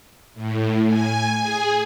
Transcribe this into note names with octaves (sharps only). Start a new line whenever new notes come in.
A2
G#5
G#4